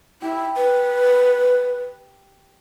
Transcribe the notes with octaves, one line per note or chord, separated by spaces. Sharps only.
E4 G4
B4